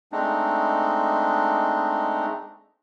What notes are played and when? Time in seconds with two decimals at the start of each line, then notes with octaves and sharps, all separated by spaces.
0.12 G#3 A3 C4 D4 D#4